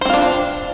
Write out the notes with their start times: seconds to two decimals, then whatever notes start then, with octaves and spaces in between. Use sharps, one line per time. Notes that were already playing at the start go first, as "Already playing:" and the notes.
0.01 C5
0.05 C4
0.09 F4
0.14 D4